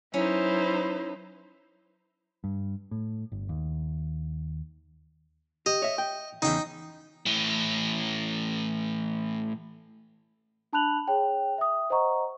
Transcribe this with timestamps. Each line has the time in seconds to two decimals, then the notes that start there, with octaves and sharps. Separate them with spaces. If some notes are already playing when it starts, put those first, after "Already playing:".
0.14 F#3 C#4 D#4 E4 B4 C5
2.44 G2
2.91 A2
3.32 G1
3.49 D#2
5.66 G4 D#5
5.82 C#5 E5
5.98 G5
6.42 E2 C#3 D#4 G5
7.26 A2 E3
10.73 D4 A5 B5 F#6 F7 F#7
11.08 G#4 C#5 G5
11.58 E5 D#6
11.90 C5 D#5 F#5 A#5 C#6